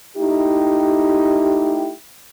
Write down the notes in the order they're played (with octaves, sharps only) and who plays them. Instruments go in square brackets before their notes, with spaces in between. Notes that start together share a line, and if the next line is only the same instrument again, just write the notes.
[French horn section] A3 D#4 E4 G4